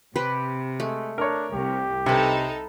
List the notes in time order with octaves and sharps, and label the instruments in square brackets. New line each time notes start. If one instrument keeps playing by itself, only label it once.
[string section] C3 [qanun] G4 B4 C5
[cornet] G#3 [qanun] A3
[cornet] D4 [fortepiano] A#4 C#5
[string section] C2 [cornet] G4
[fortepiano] C3 [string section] D#4 A4 [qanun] B4 G#5